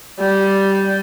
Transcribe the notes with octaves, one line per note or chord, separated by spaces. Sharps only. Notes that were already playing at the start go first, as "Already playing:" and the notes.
G3